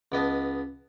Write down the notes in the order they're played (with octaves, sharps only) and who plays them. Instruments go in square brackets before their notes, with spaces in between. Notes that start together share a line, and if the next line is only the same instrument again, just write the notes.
[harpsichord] C#2 B3 D#5 A5